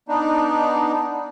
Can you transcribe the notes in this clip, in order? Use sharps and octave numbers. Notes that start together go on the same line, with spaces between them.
B3 D4 D#4